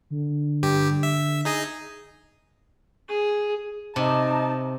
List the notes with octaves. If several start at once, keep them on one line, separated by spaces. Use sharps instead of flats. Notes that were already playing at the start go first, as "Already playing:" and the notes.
D3
G2 G4
E5
D#4 G#4 D#5
G#4
C3 D#4 A5